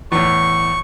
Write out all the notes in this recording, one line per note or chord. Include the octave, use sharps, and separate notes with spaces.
E2 A2 C#6